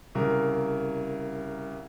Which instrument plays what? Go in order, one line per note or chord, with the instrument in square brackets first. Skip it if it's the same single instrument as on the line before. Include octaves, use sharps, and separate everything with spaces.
[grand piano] C2 C#3 A#4